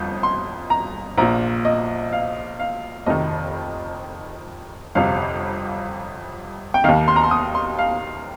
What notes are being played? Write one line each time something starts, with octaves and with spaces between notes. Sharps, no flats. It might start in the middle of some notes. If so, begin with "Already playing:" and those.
Already playing: G1 F2 G6
C6
A#5
A#1 A#2 A#5
D#5
F5
F5
F1 F2 C3 D#3 D#5
G1 F2 C3 F5
G5
D#2 D#3 F5
C6
A#5
C6
D#6
C6
F5